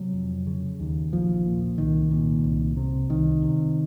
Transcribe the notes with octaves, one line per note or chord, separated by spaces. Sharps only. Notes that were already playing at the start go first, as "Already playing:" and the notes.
Already playing: C3 F#3
F2
C#3
D#2
A#1 F3
A#2
C2 D#3
A#2
C2
C3
C2 D#3
C3